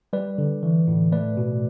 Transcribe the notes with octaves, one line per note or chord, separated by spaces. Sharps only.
G3 B4 D5
D3
E3
A2
A3 B4 D5
B2